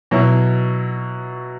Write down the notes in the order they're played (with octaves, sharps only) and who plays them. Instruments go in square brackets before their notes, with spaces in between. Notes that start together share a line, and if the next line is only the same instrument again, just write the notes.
[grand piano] B2 F#3 E4